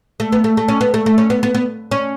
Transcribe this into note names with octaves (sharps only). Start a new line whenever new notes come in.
A3
B3
A3
A3
C#4
B3
A3
A3
C#4
B3
B3
B3
C#4